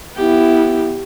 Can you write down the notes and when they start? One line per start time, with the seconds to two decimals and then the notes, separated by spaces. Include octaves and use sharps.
0.15 B3 E4 G4